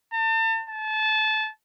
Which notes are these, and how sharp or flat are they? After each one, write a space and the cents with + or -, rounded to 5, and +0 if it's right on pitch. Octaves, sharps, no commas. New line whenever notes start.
A5 +40
A5 -25